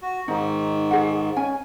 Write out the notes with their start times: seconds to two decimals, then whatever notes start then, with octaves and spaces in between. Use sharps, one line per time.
0.02 F#4
0.28 G#2 D#3 D#4
0.91 G#4 F#5
1.36 C#4 G#5